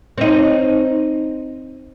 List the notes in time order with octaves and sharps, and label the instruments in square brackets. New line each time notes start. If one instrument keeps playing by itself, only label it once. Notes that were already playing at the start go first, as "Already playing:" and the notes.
[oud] C4 D#4